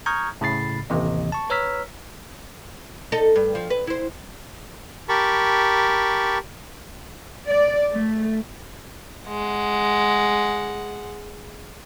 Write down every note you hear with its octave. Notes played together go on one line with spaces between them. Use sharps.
A#5 C#6 D#6 F6 G6 G#6
A2 C#3 B5 A6 C7
A1 D#2 C3 E3 D#5
A5 C#6
B4 C#5 A#5 E6 F6 B6
D#4 A4
G2
F3
B4
E4 C5
G4 A#4 A5 B5 C#6
D5
A3
G#3 F#5